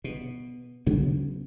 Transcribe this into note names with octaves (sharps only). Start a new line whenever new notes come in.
B2
D2 C#3 F#3 B3